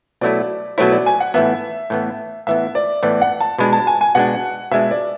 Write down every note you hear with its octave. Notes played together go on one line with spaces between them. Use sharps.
B2 F#3 A3 E4 D5
B2 F#3 A3 E4 C#5
D5
G#5
F#5
A2 E3 B3 E5
A2 E3 B3
A2 E3 B3 E5
D5
A2 E3 B3 D5
F#5
A5
B2 G#3 D4 B5
A5
G#5
G#5
B2 G#3 D4 F#5
B2 G#3 D4 E5
D5